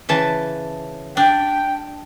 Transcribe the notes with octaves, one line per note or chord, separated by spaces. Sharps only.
C#3 E3 A5
D4 G5